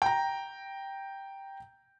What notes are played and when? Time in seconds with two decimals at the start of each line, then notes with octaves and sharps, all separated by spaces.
0.02 G5 A#5